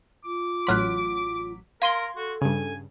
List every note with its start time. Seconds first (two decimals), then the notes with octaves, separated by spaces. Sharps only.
0.25 F4 D6
0.67 A1 F#3 C6 F6 F#6 B6
1.82 A#4 F5 C6 G#6 D#7 G7
2.16 F#4 A4
2.42 G2 C#3 G#5